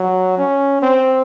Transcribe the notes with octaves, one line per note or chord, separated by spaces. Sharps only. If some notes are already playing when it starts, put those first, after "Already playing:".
Already playing: F#3
C#4
C4